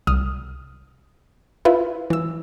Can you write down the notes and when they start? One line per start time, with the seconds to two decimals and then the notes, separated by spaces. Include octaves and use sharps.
0.07 C2 D#6 F6
1.65 E4 F4 B4
2.10 E3 E6